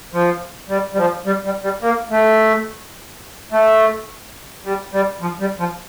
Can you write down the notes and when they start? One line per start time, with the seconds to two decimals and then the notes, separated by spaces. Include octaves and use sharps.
0.13 F3
0.69 G3
0.93 G3
0.98 F3
1.26 G3
1.44 G3
1.63 G3
1.82 A#3
2.10 A3
3.52 A3
4.65 G3
4.92 G3
5.21 F3
5.40 G3
5.59 F3